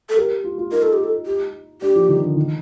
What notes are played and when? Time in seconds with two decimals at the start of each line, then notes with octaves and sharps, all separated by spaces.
0.09 A4
0.17 G4 A#4
0.44 F4
0.58 F4
0.72 D#4 A#4
0.83 A4
0.93 G4
1.04 A4
1.26 G4
1.82 D4 G4
1.96 F3
2.09 D#3
2.23 D3
2.37 D#3